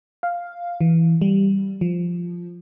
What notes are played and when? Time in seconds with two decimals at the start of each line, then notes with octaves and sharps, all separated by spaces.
0.23 F5
0.81 E3
1.21 G3
1.81 F3